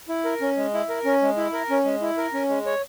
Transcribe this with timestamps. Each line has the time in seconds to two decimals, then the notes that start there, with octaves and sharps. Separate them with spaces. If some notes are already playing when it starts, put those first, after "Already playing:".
0.09 E4
0.25 A#4
0.41 C#4
0.57 G#3
0.74 E4
0.89 A#4
1.05 C#4
1.22 G#3
1.37 E4
1.53 A#4
1.70 C#4
1.85 G#3
2.02 E4
2.17 A#4
2.33 C#4
2.49 G#3
2.66 C#5